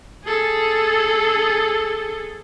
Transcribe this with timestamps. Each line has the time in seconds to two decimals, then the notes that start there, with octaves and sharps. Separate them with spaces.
0.25 G#4 A4